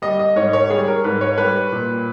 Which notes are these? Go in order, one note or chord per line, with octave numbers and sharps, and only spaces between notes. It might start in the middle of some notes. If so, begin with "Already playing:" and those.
G3 D#5
D#5
G#2 C#5
C#5
G3 G#4
A#4
G#2 B4
C#5
G3 B4
A#2